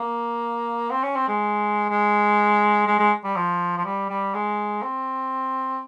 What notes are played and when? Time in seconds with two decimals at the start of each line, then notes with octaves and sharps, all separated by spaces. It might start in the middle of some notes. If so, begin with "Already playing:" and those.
Already playing: A#3
0.91 C4
1.03 C#4
1.15 C4
1.28 G#3
1.89 G#3
2.87 G#3
2.99 G#3
3.24 G3
3.36 F3
3.78 F3
3.85 G3
4.09 G3
4.34 G#3
4.83 C4